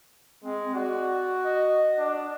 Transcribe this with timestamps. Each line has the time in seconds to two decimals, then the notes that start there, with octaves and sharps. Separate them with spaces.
0.44 G#3 C4
0.75 F#4 D5
1.45 D#5
1.98 D4